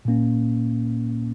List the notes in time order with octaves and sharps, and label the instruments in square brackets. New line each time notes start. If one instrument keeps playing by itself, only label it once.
[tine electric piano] A#2 A#3 C#4